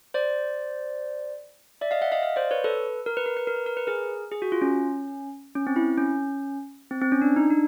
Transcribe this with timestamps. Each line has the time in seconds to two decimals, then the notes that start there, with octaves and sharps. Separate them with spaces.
0.14 C5 D5
1.81 D5 E5
1.91 D#5 F5
2.01 E5 F#5
2.12 D#5 F5
2.22 D#5 F5
2.36 C5 D5
2.51 B4 C#5
2.64 A4 B4
3.06 A#4
3.17 B4
3.26 A#4
3.37 B4
3.47 A#4
3.56 B4
3.66 A#4
3.77 B4
3.87 G#4 A#4
4.31 G#4
4.42 F#4
4.52 F4
4.62 C#4
5.55 C#4
5.67 C4
5.76 E4
5.98 C#4
6.91 C4
7.02 C4
7.12 C#4
7.22 D4
7.36 D#4
7.50 D4